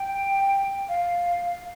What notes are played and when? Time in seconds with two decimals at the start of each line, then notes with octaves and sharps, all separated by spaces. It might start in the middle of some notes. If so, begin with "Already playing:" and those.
Already playing: G5
0.89 F5